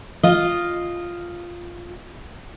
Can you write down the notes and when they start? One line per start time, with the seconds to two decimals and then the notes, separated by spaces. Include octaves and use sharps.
0.23 F4 D#5